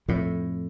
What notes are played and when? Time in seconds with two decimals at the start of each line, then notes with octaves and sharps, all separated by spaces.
0.08 F2 A2